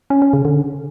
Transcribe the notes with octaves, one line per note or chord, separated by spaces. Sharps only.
C#4
C#4
C#3
D3